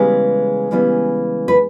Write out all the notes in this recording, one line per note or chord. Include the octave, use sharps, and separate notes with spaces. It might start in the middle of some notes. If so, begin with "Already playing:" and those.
Already playing: C#3 E3 G3 G#3 B3 G#4
C#3 E3 G3 B3
B4